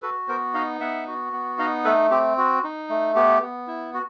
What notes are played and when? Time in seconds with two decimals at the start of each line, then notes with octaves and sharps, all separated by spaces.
0.02 F#4 A4 B4
0.28 B3 A#4 C5
0.54 D#4 D#5 F5
0.81 B3 E5 F#5
1.07 F#4
1.33 B3
1.59 D#4 D#5 F5
1.85 A3 A4 B4
2.11 C4 G4
2.38 F#4
2.64 D#4
2.90 A3
3.15 B3 G4
3.42 B3
3.67 E4
3.94 F#4